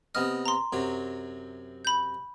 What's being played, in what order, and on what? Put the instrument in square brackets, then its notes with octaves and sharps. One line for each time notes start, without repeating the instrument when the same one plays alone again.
[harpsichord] C3 B3 D#5 [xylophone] F6
[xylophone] A#5 C6
[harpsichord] F#2 C3 F#3
[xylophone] B5 G6